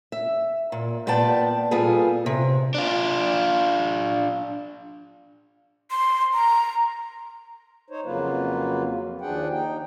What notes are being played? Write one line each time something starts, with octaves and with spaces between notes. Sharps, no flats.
E5
A#2
A#2 B3 D5 G5 A5
A#2 G3 B3 F4 G#4 A4
C3
D4 F4
C6
A#5
D#4 C5 C#5
F2 C#3 F#3 A#3 F4 B4
D#2 F3 D4 G#4 F#5 G5
D#4 G5